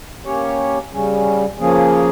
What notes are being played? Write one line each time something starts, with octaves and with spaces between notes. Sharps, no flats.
A#3 C#4 G4 C#5
C#3 G3 C#4
C#3 F3 A#3 C#4 G#4